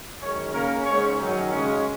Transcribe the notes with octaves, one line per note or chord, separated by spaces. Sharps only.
F#2 D#3 G#3 C#4 C#5
C#3 A#3 C#4 A#4
G#2 G#3 C#4 C#5
F#2 D#3 F#3 C#4 D#4
C#3 G#3 C#4